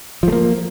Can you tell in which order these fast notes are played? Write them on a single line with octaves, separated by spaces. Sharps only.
F3 A3 A#3